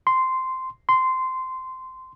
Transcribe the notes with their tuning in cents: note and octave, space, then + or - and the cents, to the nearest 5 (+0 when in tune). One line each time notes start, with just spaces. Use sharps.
C6 -10
C6 -15